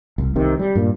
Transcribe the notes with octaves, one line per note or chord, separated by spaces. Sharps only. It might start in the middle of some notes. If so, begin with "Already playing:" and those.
C2
C2 C3 D#3
G3
G2 A#2